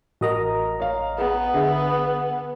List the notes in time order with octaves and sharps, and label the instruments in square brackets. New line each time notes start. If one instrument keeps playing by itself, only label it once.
[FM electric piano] A1 D#5 A#5 [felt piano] F#4 A#4
[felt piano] C#5 F5
[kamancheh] B3 [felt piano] G#4
[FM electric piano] D3 [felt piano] G#4 E5